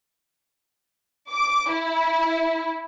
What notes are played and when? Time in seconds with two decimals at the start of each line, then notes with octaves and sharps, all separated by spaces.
1.31 D6
1.70 E4